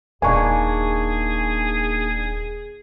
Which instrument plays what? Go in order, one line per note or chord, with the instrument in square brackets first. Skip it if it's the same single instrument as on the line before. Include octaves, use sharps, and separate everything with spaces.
[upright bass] D#1 [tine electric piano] A#3 D4 D#4 [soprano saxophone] G#4 [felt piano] G#5 C#6